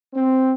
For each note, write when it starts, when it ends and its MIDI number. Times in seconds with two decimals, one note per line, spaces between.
0.14 0.53 60